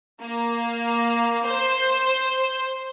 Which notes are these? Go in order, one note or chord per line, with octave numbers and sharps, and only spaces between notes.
A#3
C5